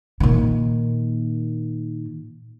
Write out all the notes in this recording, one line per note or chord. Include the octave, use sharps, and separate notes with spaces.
A#2 D#3